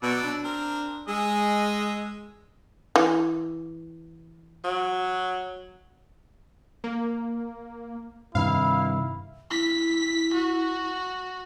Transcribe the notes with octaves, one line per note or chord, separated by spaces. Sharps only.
B2 F#3 D5 E6
D4
C4 A#4
G#3 G#4 D#5 E6
E3
F#3
A#3
G2 C3 D#3 E4 F5
E4 B6
F#4